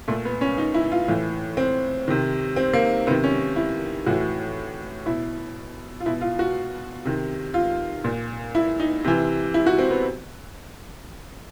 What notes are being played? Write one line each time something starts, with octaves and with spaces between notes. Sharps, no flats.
A#2 A3
B3
C#4
D#4
E4
F4
A2 E3
C4
C3 D#3
C4
A#3
C3 D#3 B3
C#4
E4
A2 E3 F#4
B2 E4
F4
B2 E4
F4
F#4
C3 D#3
F4
A#2
E4
D#4
C3 E3
E4
F#4
C4
B3